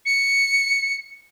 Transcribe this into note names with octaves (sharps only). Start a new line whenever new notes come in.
C#7